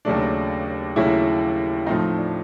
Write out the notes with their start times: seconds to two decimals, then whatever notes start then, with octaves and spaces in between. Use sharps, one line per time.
0.05 D#2 C#3 F#3 A3 D4
0.96 D#2 C#3 F#3 A3 E4
1.86 A2 F3 A3 C4 D#4
2.17 D4